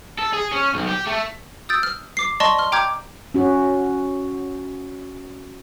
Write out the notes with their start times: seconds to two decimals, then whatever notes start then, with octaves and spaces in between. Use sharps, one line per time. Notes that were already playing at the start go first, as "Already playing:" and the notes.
0.18 A4
0.33 G#4
0.52 C#4
0.74 B1
0.87 G4
1.07 A3
1.69 D#6 E6 G6 A6 D7
1.83 F6
2.17 D6 C7
2.40 D5 D#5 A5 C6 C#6
2.58 C6 F6
2.72 G5 A#5 D6 F6 G6 G#6
3.34 C#4 F#4